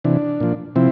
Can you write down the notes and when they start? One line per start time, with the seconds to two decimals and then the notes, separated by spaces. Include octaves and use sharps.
0.04 C3 E3 D4
0.40 A#2 F3
0.76 C3 F3 C4 E4